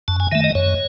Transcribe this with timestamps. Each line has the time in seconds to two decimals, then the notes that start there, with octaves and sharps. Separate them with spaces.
0.08 F#2 A5
0.20 G#5
0.32 D#3 A3 E5
0.44 D#5
0.55 F#2 C#5